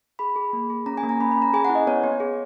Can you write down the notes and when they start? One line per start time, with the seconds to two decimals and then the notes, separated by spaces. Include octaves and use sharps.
0.19 G#4 B5
0.36 G#4
0.53 A#3
0.70 G#4
0.86 C#4 A#5
0.97 G#5
1.03 A#3
1.09 A#5
1.20 C#4 B5
1.31 B5
1.37 C#4 A#5
1.53 G#4 G#5
1.65 F#5
1.70 E4
1.75 D#5
1.87 B3 C#5
2.04 B3
2.20 G#4